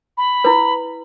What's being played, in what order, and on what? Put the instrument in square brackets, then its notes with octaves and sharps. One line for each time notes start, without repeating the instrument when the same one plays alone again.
[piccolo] B5
[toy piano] E4 B4